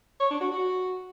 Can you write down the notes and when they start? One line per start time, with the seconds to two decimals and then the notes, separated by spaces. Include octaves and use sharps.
0.20 C#5
0.30 D4
0.41 F#4
0.51 F#4